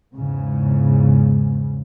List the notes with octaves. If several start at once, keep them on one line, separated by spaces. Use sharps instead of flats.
E2 G#2 C#3